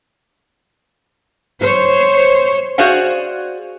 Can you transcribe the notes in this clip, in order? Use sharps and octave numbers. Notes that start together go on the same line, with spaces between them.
C5 C#5
F#4 G#4 C5 D5 F5 F#5